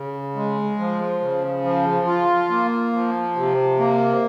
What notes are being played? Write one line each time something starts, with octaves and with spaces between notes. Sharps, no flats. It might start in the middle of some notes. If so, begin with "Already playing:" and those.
Already playing: C#3
G#3
F3
C#3
F3
F4
A#3
F3
C3
A#3